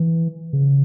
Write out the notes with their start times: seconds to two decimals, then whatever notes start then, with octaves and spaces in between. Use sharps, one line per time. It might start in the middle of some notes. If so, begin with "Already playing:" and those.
Already playing: E3
0.53 C#3